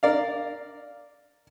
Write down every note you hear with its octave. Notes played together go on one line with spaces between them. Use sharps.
A#4 D5 F5